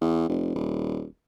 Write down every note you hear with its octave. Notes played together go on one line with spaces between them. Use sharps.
E2
F1
D#1